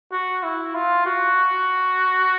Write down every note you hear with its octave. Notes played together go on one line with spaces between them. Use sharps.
F#4
E4
F4
F#4